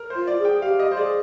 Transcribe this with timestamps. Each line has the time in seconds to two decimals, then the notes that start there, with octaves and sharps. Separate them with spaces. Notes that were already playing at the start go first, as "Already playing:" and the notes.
Already playing: A#4
0.10 C5
0.16 F4
0.27 D5
0.39 G#4
0.45 G5
0.62 G4 F5
0.80 D#5
0.92 C5
0.97 G#4 D5